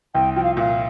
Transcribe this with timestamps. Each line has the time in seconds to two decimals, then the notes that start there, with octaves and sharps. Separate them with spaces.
0.15 C2 G5
0.36 F3 G5
0.44 F5
0.57 A#2 F5